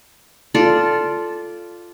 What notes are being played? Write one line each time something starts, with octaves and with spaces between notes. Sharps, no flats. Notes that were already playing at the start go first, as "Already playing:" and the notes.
F4 A4 D5